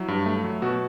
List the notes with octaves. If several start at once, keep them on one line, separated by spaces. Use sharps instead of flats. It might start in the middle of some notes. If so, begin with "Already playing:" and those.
Already playing: F#3 E4
G2
A3
F#3
B2 F#4